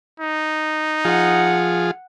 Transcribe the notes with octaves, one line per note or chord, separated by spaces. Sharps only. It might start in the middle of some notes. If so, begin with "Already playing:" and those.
D#4
F3 F4 G#4 F#5